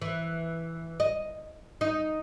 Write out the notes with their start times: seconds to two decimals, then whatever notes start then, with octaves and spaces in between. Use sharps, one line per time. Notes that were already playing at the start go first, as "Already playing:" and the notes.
0.02 E3
1.00 D#5
1.81 D#4